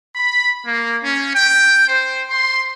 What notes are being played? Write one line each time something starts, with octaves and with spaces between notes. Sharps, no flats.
B5
A#3
C#4
G5
C5
C6